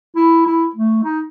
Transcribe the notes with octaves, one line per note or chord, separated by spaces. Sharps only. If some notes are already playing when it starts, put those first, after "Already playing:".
E4
E4
A3
D#4